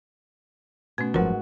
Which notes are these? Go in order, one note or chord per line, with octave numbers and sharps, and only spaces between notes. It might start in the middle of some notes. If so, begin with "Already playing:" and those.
B2 A3 C#4
F#1 G#2 F3 F#3 F#4 A#4 B4